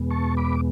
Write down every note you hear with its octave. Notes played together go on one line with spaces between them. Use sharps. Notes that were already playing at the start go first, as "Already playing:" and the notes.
Already playing: E2 B2 G#3 B3
A5 C#6
B5 D6